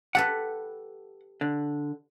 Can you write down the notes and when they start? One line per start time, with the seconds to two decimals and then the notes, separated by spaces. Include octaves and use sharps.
0.15 G4 A4 B4 F#5
1.41 D3